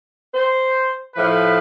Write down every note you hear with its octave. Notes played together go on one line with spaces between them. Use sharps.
C5
A2 F3 B4